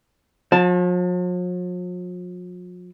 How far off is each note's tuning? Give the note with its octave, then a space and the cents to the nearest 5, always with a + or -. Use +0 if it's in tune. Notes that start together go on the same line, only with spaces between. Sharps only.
F3 +45 A5 -5